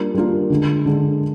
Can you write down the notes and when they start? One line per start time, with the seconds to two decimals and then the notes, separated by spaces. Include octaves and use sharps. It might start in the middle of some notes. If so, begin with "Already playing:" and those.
Already playing: G3 A#3 D4 F4 A#4
0.14 G3 A#3 D4 F4 A#4
0.50 D3 G#3 D4
0.86 D3 G#3 D4